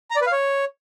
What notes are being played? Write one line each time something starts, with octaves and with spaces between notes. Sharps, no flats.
A#5
D5
B4
F5
C#5